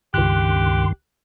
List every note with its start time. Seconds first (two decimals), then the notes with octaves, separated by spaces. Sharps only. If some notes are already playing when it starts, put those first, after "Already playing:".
0.14 C#2 G2 D#3 G4 C6 F#6